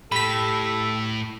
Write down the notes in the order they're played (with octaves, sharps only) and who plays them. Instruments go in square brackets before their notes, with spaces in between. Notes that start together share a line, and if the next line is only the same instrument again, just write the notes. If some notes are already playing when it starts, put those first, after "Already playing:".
[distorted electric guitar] A2 [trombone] G4 [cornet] A4 [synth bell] B5 B6